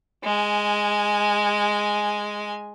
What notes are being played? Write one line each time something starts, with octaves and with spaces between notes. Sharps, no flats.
G#3 G#5